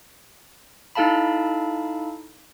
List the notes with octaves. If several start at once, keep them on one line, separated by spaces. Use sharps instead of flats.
D#4 E4 A4 F5 A5 B5